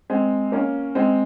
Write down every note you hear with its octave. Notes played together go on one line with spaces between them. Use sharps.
G#3 C4
A#3 C#4
G#3 C4